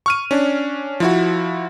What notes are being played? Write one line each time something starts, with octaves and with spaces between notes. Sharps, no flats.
C#6 F6 D#7
C#4 D4
F3 E4 F#4